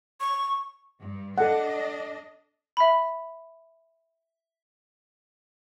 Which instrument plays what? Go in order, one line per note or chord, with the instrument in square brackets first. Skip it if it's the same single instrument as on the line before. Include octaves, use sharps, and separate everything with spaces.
[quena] C#6
[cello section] G2
[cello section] D4 D#5 [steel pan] A4 F#5
[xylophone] E5 B5